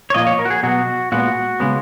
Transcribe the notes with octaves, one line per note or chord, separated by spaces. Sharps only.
C#5
A#2 F3 A#3 D#5
C#5
A#4
F#4
G#4
B2 F#3 B3 F#4
A#2 G#3 B3 F#4
C#3 G#3 B3